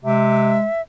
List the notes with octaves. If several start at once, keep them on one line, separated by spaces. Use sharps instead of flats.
C3 G#3 E5